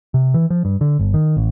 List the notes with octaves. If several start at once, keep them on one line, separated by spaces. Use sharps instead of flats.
C3
E3
F3
G2
D3
G1
D#3
A1